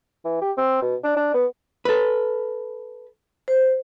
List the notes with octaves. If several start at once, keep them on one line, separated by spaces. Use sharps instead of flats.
E3
G4
C4
B2
D4
D4
B3
A4 B4
C5